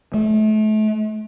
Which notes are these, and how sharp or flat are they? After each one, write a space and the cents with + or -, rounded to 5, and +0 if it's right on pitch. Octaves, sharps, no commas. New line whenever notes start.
A3 -35